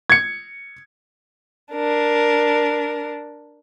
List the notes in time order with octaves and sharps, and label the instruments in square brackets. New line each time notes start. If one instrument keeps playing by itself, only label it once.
[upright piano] G#6 C#7
[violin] D4 A#4